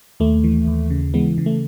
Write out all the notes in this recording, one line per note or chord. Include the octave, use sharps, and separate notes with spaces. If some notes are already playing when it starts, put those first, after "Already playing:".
D#2 A3
E3
D#2
C#3
E3 G#3 B3
C#3
A3